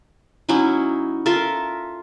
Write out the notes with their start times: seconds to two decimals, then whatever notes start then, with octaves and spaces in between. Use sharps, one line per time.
0.49 F#3 C#4 D#4 E4
1.26 F4 A4 A#4 E5